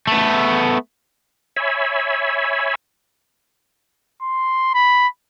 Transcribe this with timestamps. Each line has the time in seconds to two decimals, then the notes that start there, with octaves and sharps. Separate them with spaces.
0.07 A3 B3
1.56 C#5 E5 G#5 B5
4.22 C6
4.75 B5